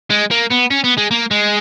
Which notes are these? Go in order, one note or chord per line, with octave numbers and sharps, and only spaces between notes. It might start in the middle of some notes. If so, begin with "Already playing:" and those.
G#3
A#3
B3
C#4
B3
G#3
A#3
G#3